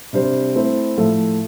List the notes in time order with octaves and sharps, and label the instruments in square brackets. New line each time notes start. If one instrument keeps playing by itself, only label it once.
[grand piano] C3 G3 D4 G4 C5
A3 C4 E4 A4 C5
A2 F3 A3